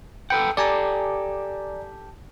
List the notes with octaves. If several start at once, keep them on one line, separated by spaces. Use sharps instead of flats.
A4 B4 F#5 G5
G4 A4 D5 G#5 A#5